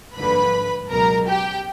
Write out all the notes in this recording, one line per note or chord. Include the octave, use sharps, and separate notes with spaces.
G#1 G2 D3 F3 A#3 B4 B5
C#2 B2 F#3 A#4 A#5
G4 G5